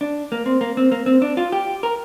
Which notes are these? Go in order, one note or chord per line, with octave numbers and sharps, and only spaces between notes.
D4
A#3
C4
A#3
C4
A#3
C4
D4
F4
G4
A#4